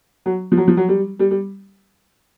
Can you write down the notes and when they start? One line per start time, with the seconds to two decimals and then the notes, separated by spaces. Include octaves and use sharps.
0.26 F#3
0.52 F3
0.57 F#3
0.68 F3
0.77 F#3
0.88 G3
1.19 G3
1.31 G3